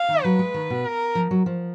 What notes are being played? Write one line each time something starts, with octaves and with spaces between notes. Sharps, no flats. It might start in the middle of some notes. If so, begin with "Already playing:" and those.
Already playing: F5
D#3
F#3 B4
G#3
D#3
B2
A#4
F3
F#3
F3